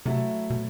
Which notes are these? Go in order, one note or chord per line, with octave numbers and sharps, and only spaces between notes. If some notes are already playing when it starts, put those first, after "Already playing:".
C3 F#3 A3 E4
B2